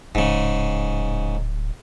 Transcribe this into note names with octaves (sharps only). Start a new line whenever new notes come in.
D1 G#2 C#3